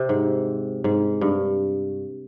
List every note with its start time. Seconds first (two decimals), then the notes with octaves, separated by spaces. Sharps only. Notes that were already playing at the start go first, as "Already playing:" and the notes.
Already playing: C3
0.09 G#2
0.84 G#2
1.21 G2